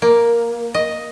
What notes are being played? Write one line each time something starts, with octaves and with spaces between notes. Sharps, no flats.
A#3
D#5